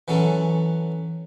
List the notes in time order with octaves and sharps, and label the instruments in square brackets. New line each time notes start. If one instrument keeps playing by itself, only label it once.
[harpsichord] E3 F#3 C#4 A4